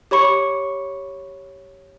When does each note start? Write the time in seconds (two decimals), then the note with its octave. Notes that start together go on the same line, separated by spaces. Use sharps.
0.11 G4 C#5 B5 C#6 C#7